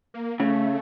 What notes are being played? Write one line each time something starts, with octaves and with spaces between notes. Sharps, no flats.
A#3
C#3 A3